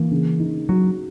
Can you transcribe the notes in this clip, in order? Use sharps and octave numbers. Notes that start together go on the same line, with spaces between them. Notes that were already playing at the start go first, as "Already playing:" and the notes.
Already playing: E3 A#3
C#3
D#4
F#3 F#4